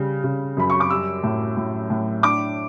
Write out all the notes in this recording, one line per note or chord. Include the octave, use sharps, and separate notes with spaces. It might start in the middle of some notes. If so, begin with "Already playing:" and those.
Already playing: C#3 G3
C#3
F#2 B5
C#6
D6
G3 E6
A2
A2
A2
D4 D6